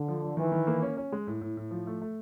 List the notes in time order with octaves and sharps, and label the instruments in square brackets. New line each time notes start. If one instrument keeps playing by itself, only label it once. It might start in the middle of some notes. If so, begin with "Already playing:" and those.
Already playing: [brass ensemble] D3
[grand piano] F3
F3
[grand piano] D#3 [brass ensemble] E3
[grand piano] D#3
A#3
C#4
C#4
G#3
A2
A2
A2
F3
A3
A3